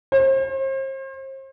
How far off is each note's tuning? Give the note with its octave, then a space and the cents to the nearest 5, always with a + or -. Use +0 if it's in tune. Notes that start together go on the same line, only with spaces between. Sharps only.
C5 +40